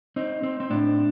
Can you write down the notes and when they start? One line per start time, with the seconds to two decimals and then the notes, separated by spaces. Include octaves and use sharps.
0.16 C4 D#4
0.43 C4
0.60 C4
0.70 A2 D4